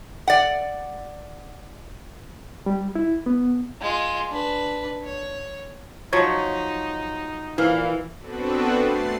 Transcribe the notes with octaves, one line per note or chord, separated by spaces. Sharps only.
D5 F#5
G3
E4
B3
G#3 F4
D4 B4
C#5
F3 F#3 D#4 C#5
A#2 E3 E4 F5
B3 C4 D4 F#4 A4 B4
A3 A6 C7